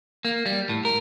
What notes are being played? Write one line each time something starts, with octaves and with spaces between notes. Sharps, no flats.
A#3
G3
A2
A#4